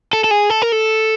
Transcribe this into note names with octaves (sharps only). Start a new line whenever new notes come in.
A4
A4
G#4
A4
A#4
A4